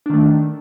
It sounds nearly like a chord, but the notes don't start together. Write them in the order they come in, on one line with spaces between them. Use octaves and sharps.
D4 D#3 A3